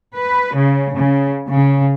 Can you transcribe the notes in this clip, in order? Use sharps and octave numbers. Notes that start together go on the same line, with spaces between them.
B4
C#3
C#3
C#3